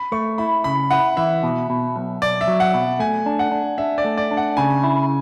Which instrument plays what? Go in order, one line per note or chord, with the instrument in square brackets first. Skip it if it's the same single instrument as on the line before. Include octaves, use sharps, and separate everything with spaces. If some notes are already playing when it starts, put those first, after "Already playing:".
Already playing: [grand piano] B5
[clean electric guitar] A3 [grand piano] C#6
[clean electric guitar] E4 [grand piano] B5
[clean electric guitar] C#3 [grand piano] B5
[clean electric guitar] E4 [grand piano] F#5
[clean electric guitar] E3 [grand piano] E5
[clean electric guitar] B2
B2
B1
[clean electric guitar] B1 [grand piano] D5
[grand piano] E5
[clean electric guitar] F#3
[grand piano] F#5
[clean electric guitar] B2
[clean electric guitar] A3 [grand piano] G#5
[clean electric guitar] D4
[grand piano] F#5
[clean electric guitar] D4
[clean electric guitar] D4 [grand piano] E5
[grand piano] D5
[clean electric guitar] A3
[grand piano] D5
[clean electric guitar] D4
[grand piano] F#5
[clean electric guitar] C#3 [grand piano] G#5
[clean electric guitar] E4